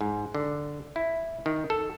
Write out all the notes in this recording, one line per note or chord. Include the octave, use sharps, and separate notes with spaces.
G#2
D3
E4
D#3
A4